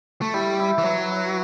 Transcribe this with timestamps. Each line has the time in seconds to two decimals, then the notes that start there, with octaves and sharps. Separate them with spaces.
0.22 A3
0.33 G3 E4
0.59 E4
0.78 E3
0.85 F#3 B4
1.11 E4